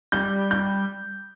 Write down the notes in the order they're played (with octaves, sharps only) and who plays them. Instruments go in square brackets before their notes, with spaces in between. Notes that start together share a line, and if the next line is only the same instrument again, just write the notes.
[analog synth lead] G3 [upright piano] G6
[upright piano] G6